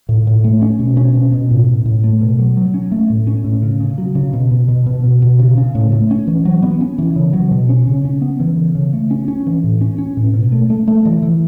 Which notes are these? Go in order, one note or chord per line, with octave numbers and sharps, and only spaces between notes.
A2
A2
A3
C#4
B2
C#4
B2
B2
A2
A2
A2
A3
B2
F#3
F#3
C#4
A3
A2
C#4
A2
C#3
C#3
F#3
C#3
B2
B2
B2
B2
B2
B2
C#3
C#3
A2
A3
C#4
E3
F#3
B3
C#4
E3
C#3
F#3
B2
C#4
C#3
C#4
B3
E3
C#3
C#3
A3
C#4
C#4
E3
A2
C#4
C#4
A2
B2
A3
A3
A3
E3
E3